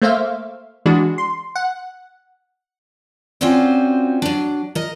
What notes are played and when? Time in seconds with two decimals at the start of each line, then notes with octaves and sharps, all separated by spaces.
0.02 A3 A#3 C5 E5 F5
0.86 E3 G#3 D4 F#4
1.18 C6
1.56 F#5
3.41 C4 C#4 F4 F#4 C5 D5
4.22 F#3 D4
4.75 A#4 D#5